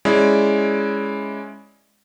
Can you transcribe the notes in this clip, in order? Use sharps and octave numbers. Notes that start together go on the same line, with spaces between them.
G#3 C#4 E4 D5